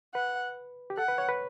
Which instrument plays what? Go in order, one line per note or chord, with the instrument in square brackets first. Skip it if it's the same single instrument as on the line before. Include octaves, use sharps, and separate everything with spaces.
[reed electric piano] B4 [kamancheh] F#5
[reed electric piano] G4
[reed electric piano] A4 [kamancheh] F#5
[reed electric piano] B4
C#5
B4